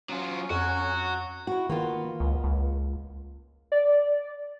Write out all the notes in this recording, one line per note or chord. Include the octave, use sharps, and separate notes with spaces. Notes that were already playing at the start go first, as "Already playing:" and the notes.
F#3 C#4 F4
F2 F#3 F#4
E4 F#4
D#3 A#3 B3 F4
C#2
C#2
D5